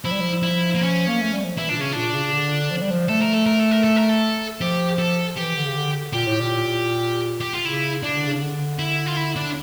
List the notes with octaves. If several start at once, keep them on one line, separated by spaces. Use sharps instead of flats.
F3 E4
G3
F3
E4
A#3
C#4
A#3
A3
G3
F3
E3 E4
A#2 D4
C#3 C#4
A#2 D4
C#3
D3
F3
G3
F3
A3 A4
A#4
A4
A#4
A4
A#4
A4
A#4
A4
F3 G4
A4
E3 G4
D3
C#3
D3
A#2 G4
A2
A#2
G4
F4
C#3 E4
C#3 D4
D3
C#3
D3
E4
F4
E4
D4